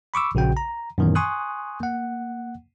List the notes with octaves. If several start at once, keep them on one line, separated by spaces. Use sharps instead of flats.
B5 C#6 D6 E6
A#1 C#3 F#4 G5
A#5
F#2 A#2 D#3 E3 B3
G#5 C6 C#6 D#6 F#6
A#3 F#5